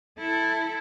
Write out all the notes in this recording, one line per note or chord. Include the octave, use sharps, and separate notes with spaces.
E4 A4